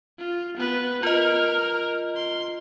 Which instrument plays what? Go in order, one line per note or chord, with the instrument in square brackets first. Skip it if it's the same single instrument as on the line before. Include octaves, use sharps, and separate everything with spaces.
[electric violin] F4
B3 B4
[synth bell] F4 D#5 [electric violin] A#4 F6
[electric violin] C6